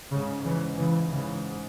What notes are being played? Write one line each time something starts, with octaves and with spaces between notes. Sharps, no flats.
G#2 C#3
C#3 E3
C#3 E3
C#3 E3